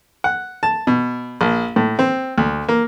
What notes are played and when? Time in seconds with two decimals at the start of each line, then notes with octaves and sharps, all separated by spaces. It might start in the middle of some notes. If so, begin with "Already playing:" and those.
0.24 F#5
0.63 A5
0.87 B2
1.41 A#1
1.76 A2
1.99 C4
2.38 D2
2.68 A#3